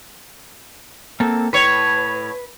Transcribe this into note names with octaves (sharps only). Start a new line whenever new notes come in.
A#3 C4 A4
A2 B4 C#5